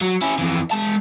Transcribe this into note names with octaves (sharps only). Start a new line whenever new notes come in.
F#3
C#4 E4
F2 E3
G#3 A5